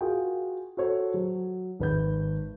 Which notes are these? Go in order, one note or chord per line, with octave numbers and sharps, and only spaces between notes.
F4 F#4 G#4 A#4 G5
F#4 A4 C5 C#5
F#3
G#1 B4 G6